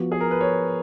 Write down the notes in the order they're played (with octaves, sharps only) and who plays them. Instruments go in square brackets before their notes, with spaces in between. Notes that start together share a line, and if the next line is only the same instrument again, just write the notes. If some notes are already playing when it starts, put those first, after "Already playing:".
Already playing: [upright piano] F3 B3 F#4
[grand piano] G#4
A#4
B4
C#5